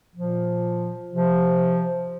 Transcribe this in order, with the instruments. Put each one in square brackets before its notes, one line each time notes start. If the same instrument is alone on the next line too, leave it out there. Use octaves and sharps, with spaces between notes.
[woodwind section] A#2 F3
C3 F3